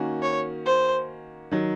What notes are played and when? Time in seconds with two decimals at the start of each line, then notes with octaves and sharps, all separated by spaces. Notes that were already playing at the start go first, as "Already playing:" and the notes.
Already playing: D#3 A#3 C#4 F#4
0.22 C#5
0.66 C5
1.51 D#3 F#3